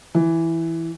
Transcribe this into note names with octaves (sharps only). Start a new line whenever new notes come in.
E3